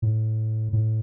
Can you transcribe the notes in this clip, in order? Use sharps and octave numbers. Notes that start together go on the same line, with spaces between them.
A2
A2